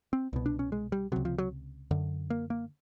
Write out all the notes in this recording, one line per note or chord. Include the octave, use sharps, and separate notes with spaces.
C4
C2 B2
D4
C#4
G#3
G3
C#2 C3 F#3
F3
F#3
F#2 D3
A#3
A#3